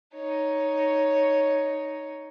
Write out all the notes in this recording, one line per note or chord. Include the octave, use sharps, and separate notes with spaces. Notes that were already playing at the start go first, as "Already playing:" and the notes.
D#4 C#5